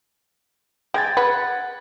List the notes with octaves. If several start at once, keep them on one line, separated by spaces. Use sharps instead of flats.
G#3 G5 G#6 A6
B4 F#5